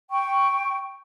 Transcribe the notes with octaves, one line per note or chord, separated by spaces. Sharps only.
G5 C#6